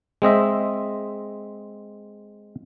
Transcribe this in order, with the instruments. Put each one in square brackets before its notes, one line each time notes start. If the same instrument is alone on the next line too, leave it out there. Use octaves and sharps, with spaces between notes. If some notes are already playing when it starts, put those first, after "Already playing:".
[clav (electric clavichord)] G#3 C4 D#5 E5